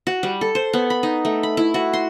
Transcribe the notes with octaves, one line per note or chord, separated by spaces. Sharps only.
F#4
G3
A4
C5
B3
B5
D#4
A3
B5
E4
F#4
C6